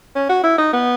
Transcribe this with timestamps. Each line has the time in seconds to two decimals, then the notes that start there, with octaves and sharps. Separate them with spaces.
0.15 C#4
0.29 F#4
0.44 E4
0.58 D#4
0.73 B3